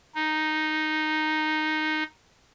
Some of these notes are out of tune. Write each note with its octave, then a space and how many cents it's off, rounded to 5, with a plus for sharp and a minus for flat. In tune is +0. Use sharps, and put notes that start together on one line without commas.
D#4 -5